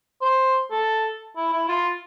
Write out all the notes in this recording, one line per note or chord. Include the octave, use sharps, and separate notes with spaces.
C5
A4
E4
E4
F4